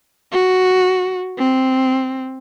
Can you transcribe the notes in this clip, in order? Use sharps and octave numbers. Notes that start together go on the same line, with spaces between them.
F#4
C4